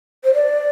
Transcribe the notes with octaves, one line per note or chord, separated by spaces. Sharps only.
C5
D5